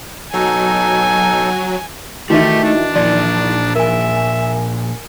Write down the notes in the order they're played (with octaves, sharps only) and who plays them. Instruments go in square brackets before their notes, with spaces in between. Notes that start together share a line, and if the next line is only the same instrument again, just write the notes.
[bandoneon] B2 D#4 A4 [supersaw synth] F#3 [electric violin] G#5
[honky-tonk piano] D#3 E3 [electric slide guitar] A3 [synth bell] F#4 D#5 E5 [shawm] G4
[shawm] D4
[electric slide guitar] A#2 F3 [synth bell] D5
[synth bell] A#4 G#5 [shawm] E5